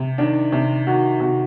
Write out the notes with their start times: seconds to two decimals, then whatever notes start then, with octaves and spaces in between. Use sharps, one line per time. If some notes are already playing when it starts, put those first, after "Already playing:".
Already playing: C3
0.18 D#3 D4
0.52 C3
0.87 D#3 F#4
1.20 C3 F#4